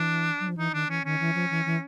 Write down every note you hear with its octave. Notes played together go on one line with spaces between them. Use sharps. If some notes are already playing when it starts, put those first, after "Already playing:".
Already playing: E3 D4
F#3
F3
E3 D#4
D#3 D4
E3 C#4
D#3 C#4
E3
F3
E3
E3